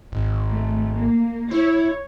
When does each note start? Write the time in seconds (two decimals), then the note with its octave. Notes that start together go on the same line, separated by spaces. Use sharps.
0.12 G#1
0.49 A3
0.95 A#3
1.51 E4 C#5